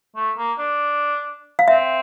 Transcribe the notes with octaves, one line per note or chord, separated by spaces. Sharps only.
A3
A#3
D4
F5
C4 E5